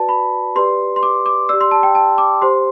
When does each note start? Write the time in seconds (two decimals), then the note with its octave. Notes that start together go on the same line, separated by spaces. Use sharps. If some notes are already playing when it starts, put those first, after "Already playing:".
Already playing: F#4 B4 D5 A5
0.09 B5
0.55 G4 B4 D5 C6
0.96 C6
1.03 D6
1.26 D6
1.49 G4 D5 E6
1.61 C6
1.71 A5
1.83 G5
1.95 A5
2.18 D6
2.42 G4 C5 C6